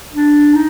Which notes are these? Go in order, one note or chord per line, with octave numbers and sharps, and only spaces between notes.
D4
D#4